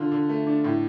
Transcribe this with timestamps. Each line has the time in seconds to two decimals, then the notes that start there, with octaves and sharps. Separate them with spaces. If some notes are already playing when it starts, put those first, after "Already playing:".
Already playing: D3 F4
0.12 D3
0.29 A3
0.47 D4
0.64 A2